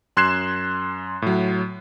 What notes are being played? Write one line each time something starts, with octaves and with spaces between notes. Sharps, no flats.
F#2 C6 F#6 G#6 C7 E7
A2 F#3